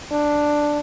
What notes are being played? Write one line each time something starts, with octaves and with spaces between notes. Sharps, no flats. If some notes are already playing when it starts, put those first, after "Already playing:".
D4